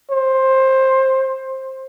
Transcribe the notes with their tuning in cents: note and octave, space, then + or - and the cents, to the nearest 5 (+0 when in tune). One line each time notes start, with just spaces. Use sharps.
C5 +15